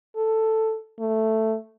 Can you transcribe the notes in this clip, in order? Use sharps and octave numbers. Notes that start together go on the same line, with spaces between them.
A4
A3